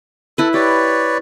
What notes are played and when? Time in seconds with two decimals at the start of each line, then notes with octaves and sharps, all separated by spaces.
0.38 E4 A4 B4
0.54 G4 B4 C#5 D5